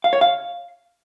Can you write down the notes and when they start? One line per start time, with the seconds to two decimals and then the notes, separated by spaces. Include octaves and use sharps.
0.04 F5
0.13 C#5
0.21 F5